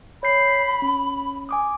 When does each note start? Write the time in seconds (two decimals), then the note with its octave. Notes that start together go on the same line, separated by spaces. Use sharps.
0.23 C#5 B5 G6 C7
0.48 B6
0.82 C#4
1.49 G#5 D6 D#6